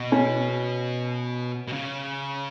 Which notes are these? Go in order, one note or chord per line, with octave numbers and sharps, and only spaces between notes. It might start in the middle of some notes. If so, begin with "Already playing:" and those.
Already playing: B2
C#4
B2
C#3